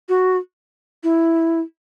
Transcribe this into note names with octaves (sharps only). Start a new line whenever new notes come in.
F#4
E4